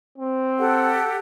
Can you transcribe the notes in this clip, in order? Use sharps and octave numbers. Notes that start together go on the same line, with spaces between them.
C4
G4 A4 F#5